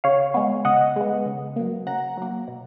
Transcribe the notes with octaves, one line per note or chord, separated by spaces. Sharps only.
C#3 C#5 F5
G#3 B3
C#3 D#5 F#5
G#3 B3
C#3
F#3 A#3
C#3 F#5 A#5
F#3 A#3
B2